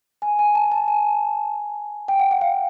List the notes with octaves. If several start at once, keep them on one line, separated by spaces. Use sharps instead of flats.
G#5
G#5
A5
A5
G#5
G5
F#5
F#5
F5